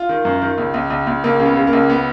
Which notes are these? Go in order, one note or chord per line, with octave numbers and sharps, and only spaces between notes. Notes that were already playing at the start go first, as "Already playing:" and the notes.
Already playing: F4
D#3
F#2
D#3
C#2
C#2
C#2
C#2
C#2 A#3
C#3
B3
C#3
A#3
C#2
B3